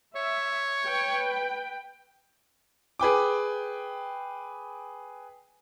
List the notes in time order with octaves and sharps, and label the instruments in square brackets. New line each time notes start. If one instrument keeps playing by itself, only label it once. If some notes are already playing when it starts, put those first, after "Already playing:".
[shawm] C#5 [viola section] E5
[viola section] B4 G5
[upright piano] G#4 B4 G5 D6